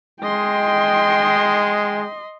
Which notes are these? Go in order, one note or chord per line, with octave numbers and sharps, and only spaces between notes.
G#3 D#5 G5 C6